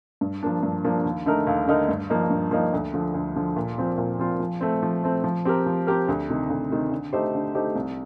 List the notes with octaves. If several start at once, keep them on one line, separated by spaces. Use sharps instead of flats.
G2
F3 A#3 D4
G2
F3 A#3 D4
D#2
D3 A3 D#4 A#4
D#2
D3 A3 D#4 A#4
G2
F3 A#3 D#4
G2
F3 A#3 D#4
D2
D3 F3
D2
D3 F3
A#2
F3 C4 F4
A#2
F3 C4 F4
F3
A3 C4
F3
A3 C4
F3
C4 G4 A#4
F3
C4 G4 A#4
D2
C3 D#3
D2
C3 D#3
D3
A3 D#4 G4 C5
D3
A3 D#4 G4 C5
C2